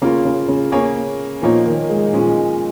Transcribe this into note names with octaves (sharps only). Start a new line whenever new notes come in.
C#3 A#3 F4 C#5
C#3
C#3
A#3 C#4 G#4 C#5
A#2 F3 A#3 D#4 C#5
D#3
G#3
A#2 F3 G#3 C#4